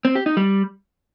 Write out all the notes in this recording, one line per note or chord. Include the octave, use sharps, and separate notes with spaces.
C4
G4
D#4
G3